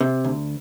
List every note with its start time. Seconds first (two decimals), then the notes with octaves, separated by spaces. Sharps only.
0.01 C3
0.24 D2